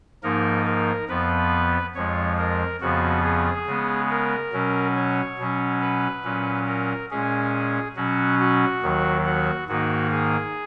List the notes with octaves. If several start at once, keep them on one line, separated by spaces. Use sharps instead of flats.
G#2 F3 A#3 D#4 A#4
A#4
F2 F3 B3 B4
F2 F3 G#3 C#5
A#4
F2 C#3 F3 B3 F#4
G#4
C#3 G#3 B3
A#4
B2 F#3 C#4
C#5
B2 F#3 C#4
B4
A#2 F#3 C#4
A#4
A#2 G#3 C#4 G#4
B2 F#3 C#4 F#4
F#4
D#2 D#3 F#3
F#4
G#2 D#3 A#3 D#4 F#4
G#4